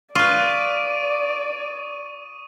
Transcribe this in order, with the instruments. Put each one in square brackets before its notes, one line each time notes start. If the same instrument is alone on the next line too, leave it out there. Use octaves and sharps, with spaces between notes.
[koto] F4 B4 [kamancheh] D5 [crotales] C#6 D#6 D#7